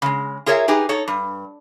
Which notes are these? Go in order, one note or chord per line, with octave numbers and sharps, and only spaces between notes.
C#3 G#3
F4 G#4 A#4 C#5 D#5 E5
D#4 G4 G#4 B4
D#4 A4 C#5
G2